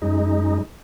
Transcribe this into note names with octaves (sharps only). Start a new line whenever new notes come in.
F#2 G#3 D#4